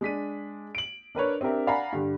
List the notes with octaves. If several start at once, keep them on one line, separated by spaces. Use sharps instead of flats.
G#3 D4 B6 D#7
D7 F#7
D4 A#4 B4 C#5
C4 D4 G4 A#4 E5
D5 F5 F#5 G#5 A#5 B5
G2 D3 G4